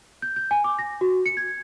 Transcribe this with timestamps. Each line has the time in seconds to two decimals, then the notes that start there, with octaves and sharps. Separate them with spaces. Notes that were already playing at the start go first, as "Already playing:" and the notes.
0.22 G6
0.36 G6
0.51 G#5
0.64 D6
0.79 A#6
1.01 F#4
1.26 C#7
1.37 G#6